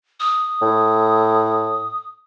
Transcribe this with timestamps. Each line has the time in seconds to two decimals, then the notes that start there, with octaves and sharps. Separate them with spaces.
0.20 D#6
0.62 A2